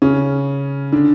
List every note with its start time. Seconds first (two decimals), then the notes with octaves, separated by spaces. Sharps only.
0.02 C#3 C#4
0.92 D3 D4